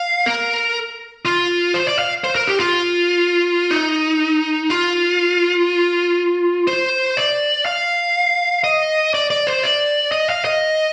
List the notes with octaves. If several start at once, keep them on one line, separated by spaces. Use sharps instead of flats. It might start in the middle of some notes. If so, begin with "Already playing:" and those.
Already playing: F5
A#4
F4
C5
D5
F5
C5
A#4
G4
F4
D#4
F4
C5
D5
F5
D#5
D5
D5
C5
D5
D#5
F5
D#5